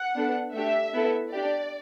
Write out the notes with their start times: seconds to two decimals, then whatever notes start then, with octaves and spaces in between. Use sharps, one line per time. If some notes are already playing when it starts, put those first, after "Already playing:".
Already playing: F#5
0.15 B3 D4 A4
0.54 A3 D4 G4 E5
0.93 B3 E4 A4
1.32 D4 G4 D5